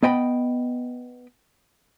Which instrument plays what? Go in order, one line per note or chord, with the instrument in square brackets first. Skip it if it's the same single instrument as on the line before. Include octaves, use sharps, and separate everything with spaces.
[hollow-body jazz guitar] B3 D#5 G5 B5